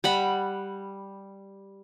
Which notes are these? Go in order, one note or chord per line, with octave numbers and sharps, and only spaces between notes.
G3 F#5 B5